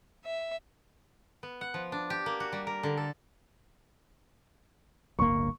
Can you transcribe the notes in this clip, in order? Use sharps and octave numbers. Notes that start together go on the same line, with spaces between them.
E5
B3
F#5
F3
D4
G4
A#3
F#4
G3
A#4
D3
A4
D1 G1 A#3 C#6